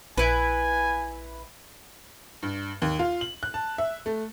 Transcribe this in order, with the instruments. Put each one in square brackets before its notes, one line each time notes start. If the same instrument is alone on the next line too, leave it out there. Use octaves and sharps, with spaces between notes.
[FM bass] A#1 [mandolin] E4 B4 [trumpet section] G#5
[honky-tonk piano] G2
D#2
F4
F#7
F#6
A5
E5
A3